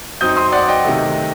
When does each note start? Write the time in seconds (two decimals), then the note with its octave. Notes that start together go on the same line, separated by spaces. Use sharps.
0.21 F#2 F#3 C4 D#4 D#6 G6
0.37 C6 D#6
0.52 D5 F#5
0.68 D#5 G5
0.84 C3 D#3 A3